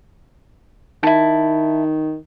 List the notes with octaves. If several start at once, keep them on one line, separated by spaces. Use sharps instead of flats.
D#3 E4 A5